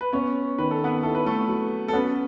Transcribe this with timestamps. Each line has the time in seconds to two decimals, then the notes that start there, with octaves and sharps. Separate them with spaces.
0.01 B4
0.13 B3 C#4 C#5
0.58 D#3 B4
0.71 A4
0.84 B3 B4
1.03 E4 A4
1.15 B4
1.26 A3 A4
1.48 F#3
1.88 A4
1.93 B3 C#4 B4